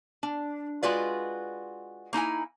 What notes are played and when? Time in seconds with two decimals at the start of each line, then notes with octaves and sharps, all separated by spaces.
0.23 D4
0.83 G#3 F4 F#4 B4 D5
2.13 A#3 D#4 E4 G#5